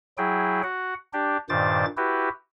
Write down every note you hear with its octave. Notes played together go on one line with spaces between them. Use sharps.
F#3 E4 G#4 G5
F#4 F#5
D4 G4
G2 A#2 D#3 C5 D6 A6
E4 F#4 G4 B4